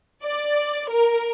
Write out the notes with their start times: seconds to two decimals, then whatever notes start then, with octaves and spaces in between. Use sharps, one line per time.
0.24 D5
0.90 A#4